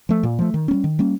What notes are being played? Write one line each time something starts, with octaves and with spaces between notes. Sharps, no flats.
F3 A3
A#2
F3 A3
D#3
A#3 C#4
G3
D#3
G3 A#3 C#4